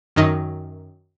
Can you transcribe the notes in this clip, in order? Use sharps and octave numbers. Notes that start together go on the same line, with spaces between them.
F#2 D#3 F#3 D#4